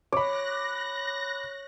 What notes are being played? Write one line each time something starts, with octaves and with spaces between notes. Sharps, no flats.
C#5 B5 D6 F#6 A#6